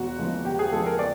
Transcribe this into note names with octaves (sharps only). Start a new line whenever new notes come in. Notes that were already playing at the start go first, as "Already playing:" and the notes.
Already playing: E1 F#4
E2 C#3 F3 G#3
E1 G4
G#4
E2 C#3 F3 G#3 A4
A#4
D5